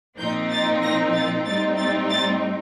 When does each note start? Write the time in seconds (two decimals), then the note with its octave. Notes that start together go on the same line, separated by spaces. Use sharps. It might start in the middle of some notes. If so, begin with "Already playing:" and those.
0.18 A#2 F3 C4 D#4 G6
0.50 A6
0.81 A#6
1.13 A6
1.45 A2 G3 C4 D#4 A6
1.77 A6
2.09 A6